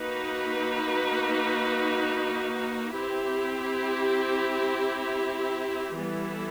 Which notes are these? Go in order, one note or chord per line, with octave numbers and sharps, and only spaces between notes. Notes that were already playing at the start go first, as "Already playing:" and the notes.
Already playing: A#3 D#4 F#4 B4
C4 E4 G4
E3 G3 B3 E4 A4